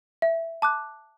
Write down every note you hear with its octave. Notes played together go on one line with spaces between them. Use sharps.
E5
A5 D6 F#6